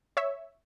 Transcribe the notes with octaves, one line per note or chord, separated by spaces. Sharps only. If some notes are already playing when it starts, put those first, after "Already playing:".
C#5 E5